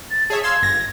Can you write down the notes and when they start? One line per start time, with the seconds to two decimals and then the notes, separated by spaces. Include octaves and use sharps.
0.11 A6
0.30 G#4 C#5 E5 A5
0.43 F5 C6 E6 G#6
0.62 G1 A#6